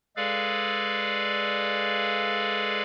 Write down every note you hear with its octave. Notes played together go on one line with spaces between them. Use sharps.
G#3 G#4 A4 B4 D5 F5